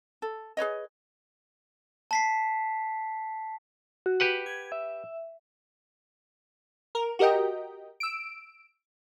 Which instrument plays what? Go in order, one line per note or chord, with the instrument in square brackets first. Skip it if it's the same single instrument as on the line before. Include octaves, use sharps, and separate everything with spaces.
[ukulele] A4
G#4 B4 C#5 D#5
[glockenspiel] A5 B6 C7
[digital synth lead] F#4
[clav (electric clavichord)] G4 B4 F#5
[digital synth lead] G#6
E5
[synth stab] A#4
F#4 G4 A#4 D#5 G5
E6 D7